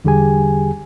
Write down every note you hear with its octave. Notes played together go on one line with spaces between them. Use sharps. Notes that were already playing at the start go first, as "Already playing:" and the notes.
E2 D3 G3 G4 G#4 G#5